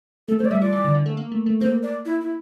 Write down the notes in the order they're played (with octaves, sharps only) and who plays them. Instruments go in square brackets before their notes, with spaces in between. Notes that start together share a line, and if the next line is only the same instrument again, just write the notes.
[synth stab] A3 [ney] A4
[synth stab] A3 [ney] C5
[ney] D5
[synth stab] G3 [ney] E5
[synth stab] F3 [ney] D5
[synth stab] E3
D3
D3
A3
A#3
A3
A3
[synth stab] A#3 [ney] C5
[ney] D5
E4
E4